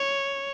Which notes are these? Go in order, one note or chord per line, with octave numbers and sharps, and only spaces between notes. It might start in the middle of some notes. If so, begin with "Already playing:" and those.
Already playing: C#5